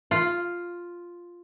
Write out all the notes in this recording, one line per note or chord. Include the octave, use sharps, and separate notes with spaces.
F4